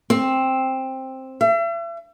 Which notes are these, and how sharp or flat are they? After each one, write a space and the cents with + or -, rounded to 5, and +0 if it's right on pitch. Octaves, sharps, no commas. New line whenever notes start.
C4 +10
E5 +40